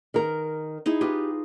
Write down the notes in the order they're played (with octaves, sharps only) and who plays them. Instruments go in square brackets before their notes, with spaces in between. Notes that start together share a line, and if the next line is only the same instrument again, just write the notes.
[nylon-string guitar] D#3 A#4
[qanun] D#4 E4 G#4
[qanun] F4 B4 D#5 [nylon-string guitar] G4